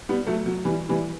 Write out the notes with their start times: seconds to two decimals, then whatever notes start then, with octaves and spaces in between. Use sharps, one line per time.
0.09 G3 B3
0.27 F#3 A3
0.46 F#3
0.65 E3 G3
0.89 E3 G3